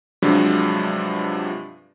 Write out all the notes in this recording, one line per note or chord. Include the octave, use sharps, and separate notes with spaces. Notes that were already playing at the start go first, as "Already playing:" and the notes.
G2 C3 F3 F#3 G#3 D4